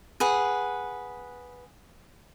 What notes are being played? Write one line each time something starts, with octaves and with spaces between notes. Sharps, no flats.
G#4 B4 F#5